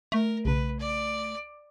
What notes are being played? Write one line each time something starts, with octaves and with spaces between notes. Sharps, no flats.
A3 A#4
B1 C#3 B4
D5